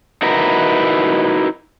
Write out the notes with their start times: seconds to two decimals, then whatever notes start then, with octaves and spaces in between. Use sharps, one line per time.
0.22 D#4 E4 F#4 A#4 B4